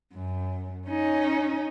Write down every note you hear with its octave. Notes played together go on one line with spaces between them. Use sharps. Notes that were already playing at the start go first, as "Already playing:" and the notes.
F#2
C#4 D#4